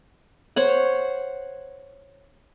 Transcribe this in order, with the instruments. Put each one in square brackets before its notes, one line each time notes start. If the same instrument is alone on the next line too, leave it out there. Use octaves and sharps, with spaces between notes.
[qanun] C5 C#5 F#5